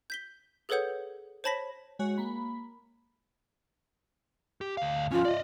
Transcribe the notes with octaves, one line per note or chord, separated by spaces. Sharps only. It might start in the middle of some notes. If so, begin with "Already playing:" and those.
G6 B6 G7
G#4 A4 B4 C#5 F#5 G6
C5 C#5 A5 B5 A#6 B6
G#3 F#4 C#5
A#3 B5
G4
D2 F5
F3 C#4 F4
D5 D#5